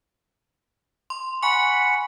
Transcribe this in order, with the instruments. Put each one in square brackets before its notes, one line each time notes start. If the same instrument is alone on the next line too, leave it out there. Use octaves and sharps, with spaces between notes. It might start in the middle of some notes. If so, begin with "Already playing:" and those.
[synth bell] C6
[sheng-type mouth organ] F#5 B5 [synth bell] G#5 C#6